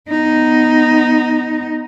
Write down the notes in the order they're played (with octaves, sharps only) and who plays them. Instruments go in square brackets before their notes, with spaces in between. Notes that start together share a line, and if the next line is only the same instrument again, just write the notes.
[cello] B3 D#4